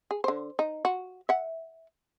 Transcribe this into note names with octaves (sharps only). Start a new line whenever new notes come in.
G#4
D3 C5
D#4
F#4
E5 F#5